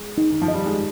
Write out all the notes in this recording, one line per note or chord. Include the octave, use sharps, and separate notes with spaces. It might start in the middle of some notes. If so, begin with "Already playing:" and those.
Already playing: G#3
D#4
D#3
F3
D#5
G3
G#3